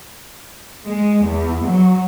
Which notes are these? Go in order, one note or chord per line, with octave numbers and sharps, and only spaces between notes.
G#3
E2
F#3